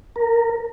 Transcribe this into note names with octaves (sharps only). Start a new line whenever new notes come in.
A#4